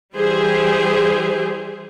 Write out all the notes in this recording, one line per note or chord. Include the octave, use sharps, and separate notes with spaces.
E3 G3 G4 G#4 C5